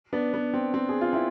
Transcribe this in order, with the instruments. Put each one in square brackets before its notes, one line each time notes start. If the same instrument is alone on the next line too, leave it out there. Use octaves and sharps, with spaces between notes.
[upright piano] B3 D4
B3
C4
C4
G#4
F4
C4 E4